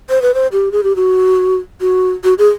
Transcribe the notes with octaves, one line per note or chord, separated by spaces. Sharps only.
C5
B4
C5
G4
G#4
G4
F#4
F#4
F#4
G#4